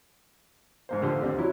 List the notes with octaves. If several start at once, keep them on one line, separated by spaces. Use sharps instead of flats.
G#2 A#3 C5
D3 F3 A3 G4 C5
D#2 C4 D4
C3 F#3 E4